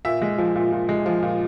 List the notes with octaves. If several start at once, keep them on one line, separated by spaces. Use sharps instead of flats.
A#2 E5
G#3
F3
A#2
A#2
G#3
F3
A#2